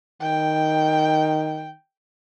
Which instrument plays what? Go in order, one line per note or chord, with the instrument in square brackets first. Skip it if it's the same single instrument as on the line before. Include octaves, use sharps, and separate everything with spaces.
[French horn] D#3 [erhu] G5